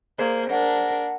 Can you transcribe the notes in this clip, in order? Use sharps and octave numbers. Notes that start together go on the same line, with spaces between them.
A#3 G#4 C5 D5
D4 A#4 F#5